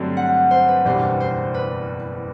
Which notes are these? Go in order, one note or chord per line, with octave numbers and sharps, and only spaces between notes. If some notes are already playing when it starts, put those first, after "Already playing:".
Already playing: G2 D3 F#3 A3 C4
F#5
C5
B4
F#1 E2 B2 G3 D4 C5
C5
B4